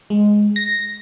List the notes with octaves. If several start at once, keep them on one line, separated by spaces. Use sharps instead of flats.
G#3
A#6